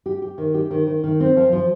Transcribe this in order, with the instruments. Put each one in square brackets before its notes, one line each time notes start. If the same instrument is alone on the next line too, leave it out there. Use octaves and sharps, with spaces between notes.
[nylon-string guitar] G4
G4
D#3
G4
D#3
D#3
D#3
C4
F3
F3